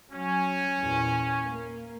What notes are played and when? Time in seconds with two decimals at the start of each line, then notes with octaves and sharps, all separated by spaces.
0.12 F#3 C#4
0.79 E2 A#2
1.42 A#3